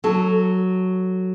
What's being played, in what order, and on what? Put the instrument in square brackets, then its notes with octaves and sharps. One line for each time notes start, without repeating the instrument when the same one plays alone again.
[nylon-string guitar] F#3 A4